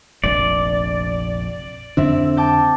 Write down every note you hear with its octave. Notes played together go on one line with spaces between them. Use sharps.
F1 A#1 D5
F2 D3 C4 D4 E5
G5 A5 D6